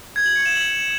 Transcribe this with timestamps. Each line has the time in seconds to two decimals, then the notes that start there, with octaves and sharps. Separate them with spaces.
0.16 G#6
0.26 F#7
0.36 C#7
0.46 E7
0.55 F#7